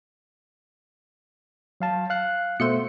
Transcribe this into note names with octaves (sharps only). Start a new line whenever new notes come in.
F#3 F5 A5
F5 F#6
B2 A3 C5 C#7